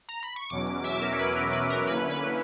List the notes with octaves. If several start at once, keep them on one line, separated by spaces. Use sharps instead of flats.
A#5
B5
C#6
E2 B2 F#3 C#4 D6
D6
E5
A#4
C#5
B4
A#4
B4
A#4
D3 A#3 C#4 E4 B4
B4